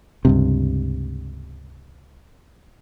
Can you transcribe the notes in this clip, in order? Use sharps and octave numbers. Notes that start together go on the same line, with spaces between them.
C#2 G2 C3